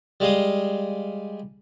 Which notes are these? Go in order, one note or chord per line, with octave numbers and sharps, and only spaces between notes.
G3 G#3 F5 D#6